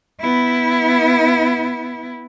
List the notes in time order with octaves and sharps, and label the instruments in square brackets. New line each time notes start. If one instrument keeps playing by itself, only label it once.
[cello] B3 E4